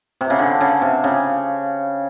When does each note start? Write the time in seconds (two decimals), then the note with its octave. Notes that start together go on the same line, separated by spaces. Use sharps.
0.21 C3
0.30 C#3
0.39 D3
0.60 C#3
0.82 C3
1.04 C#3